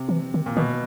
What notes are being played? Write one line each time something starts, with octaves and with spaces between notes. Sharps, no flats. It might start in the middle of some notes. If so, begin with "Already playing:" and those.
Already playing: C3
F3
E3
D#3
A#2
B2 D#3